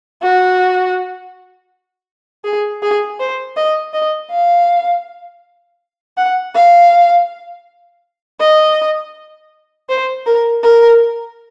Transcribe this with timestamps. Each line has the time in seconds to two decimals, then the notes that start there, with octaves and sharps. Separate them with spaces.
0.23 F#4
2.45 G#4
2.83 G#4
3.20 C5
3.57 D#5
3.94 D#5
4.31 F5
6.17 F#5
6.54 F5
8.40 D#5
9.89 C5
10.26 A#4
10.64 A#4